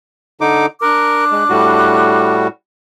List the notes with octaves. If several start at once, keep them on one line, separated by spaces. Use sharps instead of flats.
D3 D#4 D6
D4 A#4 D6 F#6
G#3
A2 G3 F#4